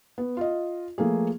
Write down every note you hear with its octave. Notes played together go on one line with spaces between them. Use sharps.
B3
F4 D#5
F3 A3 A#3 G#4